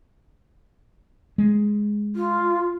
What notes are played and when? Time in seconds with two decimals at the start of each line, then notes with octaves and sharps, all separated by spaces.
1.38 G#3
2.16 F4